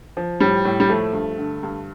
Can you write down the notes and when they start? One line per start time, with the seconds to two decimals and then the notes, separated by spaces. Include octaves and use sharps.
0.17 F3
0.40 A2 G3
0.65 A2
0.80 G3
0.89 F3 A3
1.13 G2
1.38 D3
1.63 G2